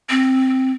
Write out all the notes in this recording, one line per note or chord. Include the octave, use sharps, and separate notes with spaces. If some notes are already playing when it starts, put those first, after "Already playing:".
C4